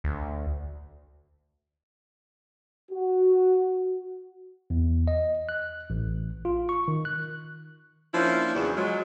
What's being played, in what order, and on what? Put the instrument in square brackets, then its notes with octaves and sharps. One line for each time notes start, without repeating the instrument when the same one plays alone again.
[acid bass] D2
[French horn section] F#4
[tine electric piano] E2
D#5
F#6
A1
F4
C#6
D#3
F#6
[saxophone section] F3 A#3 C#4 D4 E4
E2 C#3 F#3 B3 D4
F3 F#3 G#3